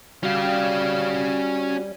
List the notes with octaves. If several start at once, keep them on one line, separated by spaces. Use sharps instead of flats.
G3 C#4 F#4 F5